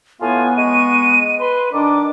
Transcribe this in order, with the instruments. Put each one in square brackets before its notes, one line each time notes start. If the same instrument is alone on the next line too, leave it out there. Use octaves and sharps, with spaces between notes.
[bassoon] A2 [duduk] B3 [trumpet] F4 [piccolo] G#5
[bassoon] G#3 [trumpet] C#6 [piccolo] D#7
[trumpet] B4 [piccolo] C6
[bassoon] D#3 [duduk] D4 [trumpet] D5 [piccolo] D6